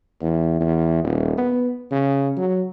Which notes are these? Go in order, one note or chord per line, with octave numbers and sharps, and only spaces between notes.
E2
E2
D#1
B3
C#3
F#3